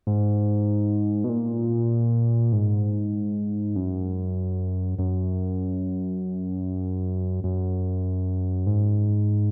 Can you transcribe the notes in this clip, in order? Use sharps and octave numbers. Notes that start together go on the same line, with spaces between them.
G#2
B2
A#2
G#2
F#2
F#2
F#2
G#2